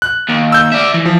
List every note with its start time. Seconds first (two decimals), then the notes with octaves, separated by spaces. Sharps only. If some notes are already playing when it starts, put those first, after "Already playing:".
0.02 F#6
0.29 D#2
0.52 E6 G6
0.72 D5 E5
0.94 E3
1.06 F3